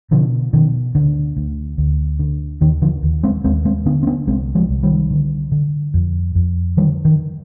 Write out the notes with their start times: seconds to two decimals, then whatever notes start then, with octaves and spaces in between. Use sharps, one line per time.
0.11 B2 D3 F3
0.53 B2 D#3
0.95 D2 D3
1.37 D2
1.78 D2
2.19 D3
2.61 D#2 D#3
2.82 D3 F3
3.03 D#2
3.23 G#3 C4
3.44 D#2 G#3 C4
3.65 G#3 C4
3.86 D3 B3 D4
4.03 C4
4.07 B3 D4
4.27 C2 G#3 C4
4.55 F3 G#3
4.69 C2
4.83 D#3 G3
5.11 D3
5.52 D3
5.94 F2
6.35 F2
6.77 D3 D#3 G3
7.05 D#3